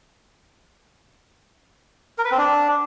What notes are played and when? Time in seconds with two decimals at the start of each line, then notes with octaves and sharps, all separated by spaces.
2.18 A#4
2.25 B4
2.31 C4
2.38 D4